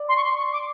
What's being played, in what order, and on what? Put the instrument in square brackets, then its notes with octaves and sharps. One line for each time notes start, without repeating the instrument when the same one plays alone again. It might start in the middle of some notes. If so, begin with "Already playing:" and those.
Already playing: [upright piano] D5
[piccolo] C6
C#6
C6
C#6
D6